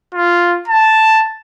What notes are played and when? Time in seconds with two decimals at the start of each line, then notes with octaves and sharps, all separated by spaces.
0.14 F4
0.68 A5